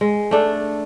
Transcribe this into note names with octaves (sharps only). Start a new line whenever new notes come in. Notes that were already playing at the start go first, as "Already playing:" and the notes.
G#3
A3 D4 A4